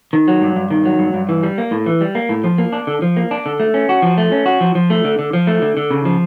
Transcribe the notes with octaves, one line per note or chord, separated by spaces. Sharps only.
D#3
F#3
G2
G2
D#3
F#3
G2
G2
E3
G3
A#3
A2
E3
G3
A#3
A2
F3
A#3
D4
D3
F3
A#3
D4
D3
A3
C#4
F#4
F3
A3
C#4
F#4
F3
F3
A3
D3
D3
F3
A3
D3
D3
C#3
F3